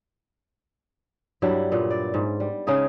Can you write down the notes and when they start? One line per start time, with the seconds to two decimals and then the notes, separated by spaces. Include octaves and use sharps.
1.42 G2 F#3 G3 E4
1.71 A#2 B3
1.90 D5
2.14 G#2
2.40 G3
2.67 C#3 G#3 D#4 G#4